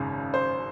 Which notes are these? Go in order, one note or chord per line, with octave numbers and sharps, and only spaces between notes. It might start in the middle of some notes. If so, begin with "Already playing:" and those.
Already playing: G#1 F#2 C#3
C5